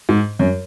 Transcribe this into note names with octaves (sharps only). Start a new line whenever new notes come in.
G#2
F#2